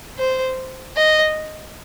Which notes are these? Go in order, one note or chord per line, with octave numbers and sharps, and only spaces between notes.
C5
D#5